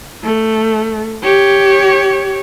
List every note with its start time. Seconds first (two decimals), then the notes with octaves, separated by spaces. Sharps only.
0.23 A3
1.24 G4 C#5